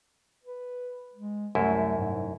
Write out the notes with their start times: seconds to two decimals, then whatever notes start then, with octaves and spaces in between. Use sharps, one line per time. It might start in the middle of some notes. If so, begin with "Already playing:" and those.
0.44 B4
1.15 G#3
1.55 C2 F#2 A3 E4
1.98 G#2